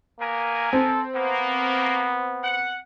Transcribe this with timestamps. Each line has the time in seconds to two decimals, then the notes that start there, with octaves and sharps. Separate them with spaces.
0.20 A#3 B3 A#4 G#5
0.73 C4 A4
1.15 A#3 B3
2.43 F#5